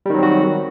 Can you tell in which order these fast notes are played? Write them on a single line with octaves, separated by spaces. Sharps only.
G3 D#3 F#3 C4 F#4